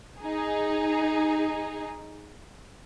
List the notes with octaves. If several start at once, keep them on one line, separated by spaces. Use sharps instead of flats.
D#4 G#4